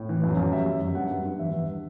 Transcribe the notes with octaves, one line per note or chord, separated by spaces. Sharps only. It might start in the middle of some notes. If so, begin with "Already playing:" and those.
Already playing: A2
E3
F#2
F#2
G3 E5
F#2
F#2
G2 F#5
G2
G2
E2 E5
E2